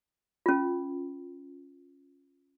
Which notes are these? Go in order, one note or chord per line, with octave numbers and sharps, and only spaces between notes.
C#4 F4